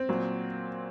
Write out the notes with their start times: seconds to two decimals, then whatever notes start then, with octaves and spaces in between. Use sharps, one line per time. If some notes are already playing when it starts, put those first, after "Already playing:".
Already playing: C4
0.09 A#2 F#3